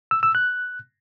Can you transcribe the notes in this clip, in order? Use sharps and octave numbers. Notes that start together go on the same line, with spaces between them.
E6
E6
F#6